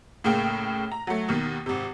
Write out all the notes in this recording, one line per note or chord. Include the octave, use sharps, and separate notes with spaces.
A2 C#3 A#3 G5
A#5
F#3 A3
D#2 B2 D#3
G#1 C3